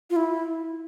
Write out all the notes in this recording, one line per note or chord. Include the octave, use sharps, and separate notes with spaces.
F4
E4